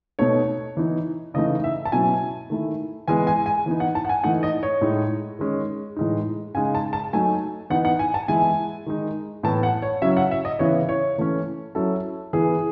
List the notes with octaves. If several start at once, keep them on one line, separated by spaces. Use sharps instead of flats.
B2 A3 D#4 C#5
E3 B3 D#4
C#3 E3 A3 D#4 D#5
E5
A5
B2 F#3 C#4 E4 G#5
D#3 A3 E4
E3 G#3 B3 G#5
G#5
G#5
E3 B3 D#4
F#5
A5
F#5
G#5
E3 A3 D#4 F#5
D#5
C#5
A2 G#3 D#4
D#3 G#3 C#4
A2 E3 G#3 D#4
C#3 G#3 D#4 G#5
A5
A5
F#3 A3 D#4 G#5
E3 B3 D#4 F#5
F#5
G#5
A5
E3 G#3 B3 E4 G#5
D#3 G#3 D#4
A2 E3 B3 A5
F#5
C#5
C#3 F#3 C#4 E4 E5
F#5
E5
D#5
C#3 E3 B3 E4 C#5
C#5
E3 A3 C#4
F#3 C#4 E4 A4
E3 B3 E4 G#4